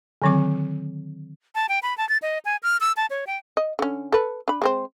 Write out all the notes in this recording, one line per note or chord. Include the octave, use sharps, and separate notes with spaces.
D3 D#3 F#3 C4 D6
A5
G5
B5
A5
A6
D#5
G#5
F6
E6
A5
C#5
G5
D#5
D3 C#4
A4 B4
D4 B5
G#3 C4 C5